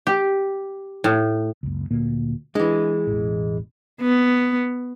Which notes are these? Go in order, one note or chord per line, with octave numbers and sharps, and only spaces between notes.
G4
A2
F#1 C#2
D2 A#2 A#3
E3 G#3 D4
E1 A1
B3